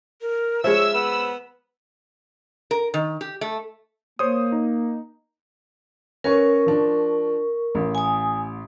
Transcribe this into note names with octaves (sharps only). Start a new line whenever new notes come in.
A#4
F3 G#3 C#5 E5 E6
B3 B5
A#4
D#3
G4
A3
A#3 C5 C#5 D#6
D#4
C#4 A#4 B4 C#5 C#6
F3 D4
A1
G#5 D#6